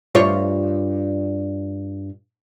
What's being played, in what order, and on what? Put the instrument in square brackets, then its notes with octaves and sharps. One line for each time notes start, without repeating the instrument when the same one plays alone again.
[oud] G2 F4 C#5